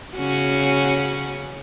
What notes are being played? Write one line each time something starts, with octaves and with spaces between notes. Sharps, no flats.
C#3 C#4 F#4